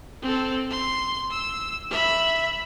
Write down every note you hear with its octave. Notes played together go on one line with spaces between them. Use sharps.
C4 A4
C6
E6
E5 B5